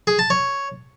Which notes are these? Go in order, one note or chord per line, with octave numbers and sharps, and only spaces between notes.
G#4
A5
C#5